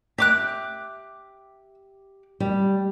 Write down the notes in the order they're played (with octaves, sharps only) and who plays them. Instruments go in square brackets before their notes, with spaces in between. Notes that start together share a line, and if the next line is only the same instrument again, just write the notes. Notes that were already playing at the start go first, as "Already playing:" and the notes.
[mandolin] G4 D6 F#6 [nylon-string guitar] E5
[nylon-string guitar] G3